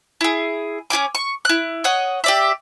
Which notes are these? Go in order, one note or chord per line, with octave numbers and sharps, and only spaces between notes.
E4 G#4
C#4 F4 G#5 D6
C#6
E4 F#6
C#5 D#5 F#5
G4 D5 E5